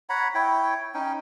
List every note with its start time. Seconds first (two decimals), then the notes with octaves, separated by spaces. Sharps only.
0.09 C#5 F#5 A#5 B5
0.34 E4 C#5 G5
0.94 C#4 D#4 G5